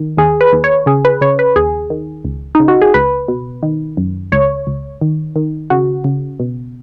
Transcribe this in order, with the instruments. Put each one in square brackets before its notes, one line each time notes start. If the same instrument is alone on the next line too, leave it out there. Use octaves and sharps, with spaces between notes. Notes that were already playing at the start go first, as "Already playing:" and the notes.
Already playing: [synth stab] D#3
D#2 G#4
B4
D#2
C#5
C#3 G#4
B4
C#3 C#5
B4
D#2 G#4
D#3
C#2
C#3 D#4
F#4
G#4
C#2 B4
B2
D#3
F#2
C#2 C#5
C#2
D#3
D#3
C#3 F#4
C#3
B2